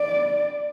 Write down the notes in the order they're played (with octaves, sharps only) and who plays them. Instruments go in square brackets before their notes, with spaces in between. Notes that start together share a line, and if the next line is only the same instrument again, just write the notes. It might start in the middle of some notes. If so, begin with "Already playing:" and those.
Already playing: [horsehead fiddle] D5